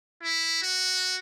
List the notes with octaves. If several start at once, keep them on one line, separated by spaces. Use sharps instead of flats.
E4
F#4